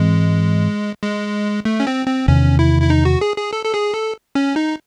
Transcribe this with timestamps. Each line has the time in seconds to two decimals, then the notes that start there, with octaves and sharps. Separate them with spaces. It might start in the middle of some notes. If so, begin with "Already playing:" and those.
Already playing: G#2 E3 G#3 C4
1.04 G#3
1.65 A3
1.80 C#4
1.87 C4
2.07 C4
2.28 E2 C3 D#3 C#4
2.59 E4
2.82 E4
2.90 D#4
3.05 F#4
3.21 G#4
3.37 G#4
3.53 A4
3.65 A4
3.74 G#4
3.94 A4
4.35 C#4
4.56 D#4